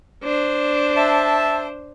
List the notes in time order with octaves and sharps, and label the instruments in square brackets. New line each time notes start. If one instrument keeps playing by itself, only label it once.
[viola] D4 C5
[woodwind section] E5 A5